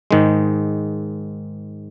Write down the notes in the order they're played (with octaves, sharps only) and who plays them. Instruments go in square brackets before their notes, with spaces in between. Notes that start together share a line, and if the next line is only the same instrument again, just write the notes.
[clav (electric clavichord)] G#2 D#3 G#3